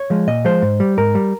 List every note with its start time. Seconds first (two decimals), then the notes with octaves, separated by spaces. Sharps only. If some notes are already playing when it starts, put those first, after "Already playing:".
Already playing: C#5
0.10 F3 G#3
0.27 A#2 D#5
0.45 F3 G#3 C5
0.62 G#2
0.80 G3
0.98 G#2 A#4
1.15 G3